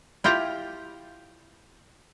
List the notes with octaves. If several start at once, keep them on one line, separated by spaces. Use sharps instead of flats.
E4 F4 G4 G5 A#5